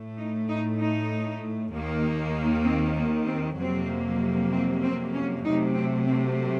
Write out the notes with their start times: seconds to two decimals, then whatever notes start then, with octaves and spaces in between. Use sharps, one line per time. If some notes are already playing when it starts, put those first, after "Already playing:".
Already playing: A2 A3
0.19 D#4
0.50 D#4
0.80 D#4
1.74 D#2 D#3 A#3
2.66 C4
2.98 A#3
3.28 C4
3.58 F2 C3 F#3 A#3 C4
4.52 C4
4.83 C4
5.14 C#4
5.44 C3 F#3 A3 D#4
5.75 C4
6.07 C4